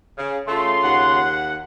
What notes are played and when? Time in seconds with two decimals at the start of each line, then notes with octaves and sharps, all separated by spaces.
0.18 C#3
0.48 C#3 A3 F4 C6
0.84 D#2 F#5